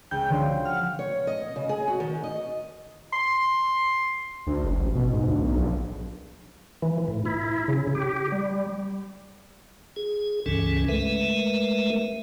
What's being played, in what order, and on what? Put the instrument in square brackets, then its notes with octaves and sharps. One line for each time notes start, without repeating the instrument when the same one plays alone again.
[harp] C#2 [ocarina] G5 [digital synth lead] G6
[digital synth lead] D3 [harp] F3 F#4 C5
[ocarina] F#5 [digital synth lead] F6
[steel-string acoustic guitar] C#5
D#5
C#3
G#4
F#4
D#3
D#5
[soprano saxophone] C6
[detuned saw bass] D2
F#1
A1
B2
G#2
D2
B1
A#1
[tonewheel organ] E3
A2
E4
C#3
G4
G3
G#4
C#2 G2 C#3 E3 C#4 A4
G#3 A3 A#4 B4 E5